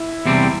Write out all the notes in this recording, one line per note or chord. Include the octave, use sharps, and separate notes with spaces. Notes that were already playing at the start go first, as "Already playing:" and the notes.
Already playing: E4
E2 C3 G3 C4